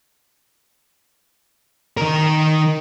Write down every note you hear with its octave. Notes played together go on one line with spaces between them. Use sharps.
D#3 A#4